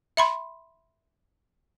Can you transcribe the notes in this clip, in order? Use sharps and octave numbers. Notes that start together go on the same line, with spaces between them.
E5 B5 C6